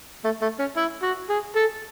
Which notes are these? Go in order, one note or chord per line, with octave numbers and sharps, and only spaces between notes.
A3
A3
C#4
E4
F#4
G#4
A4